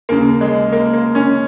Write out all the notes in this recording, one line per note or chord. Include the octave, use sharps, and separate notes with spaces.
D#2 C#3 A#3
G#3
A#3
A#3
C#4